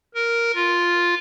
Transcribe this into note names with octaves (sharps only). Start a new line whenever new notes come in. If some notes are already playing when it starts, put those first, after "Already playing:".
A#4
F4